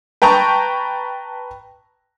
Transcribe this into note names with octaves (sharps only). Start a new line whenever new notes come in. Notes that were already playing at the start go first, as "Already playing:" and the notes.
B4 G5 A5 A#5 C#6